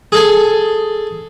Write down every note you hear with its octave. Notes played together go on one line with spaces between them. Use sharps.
G#4 A4 G#5